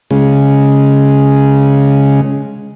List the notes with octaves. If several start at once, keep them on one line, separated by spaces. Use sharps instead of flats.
C#3 G#3